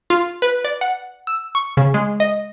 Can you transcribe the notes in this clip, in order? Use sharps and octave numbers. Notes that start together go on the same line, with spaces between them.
F4
B4
D5
F#5
E6
C#6
C#3
G#3
D#5